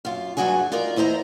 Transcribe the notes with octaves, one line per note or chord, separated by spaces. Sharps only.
F#2 F4
G2 F#3 D4 F#4 G#4 G#5
D#4 F4 A#4 D5
E2 E4 C5 D#5 A#5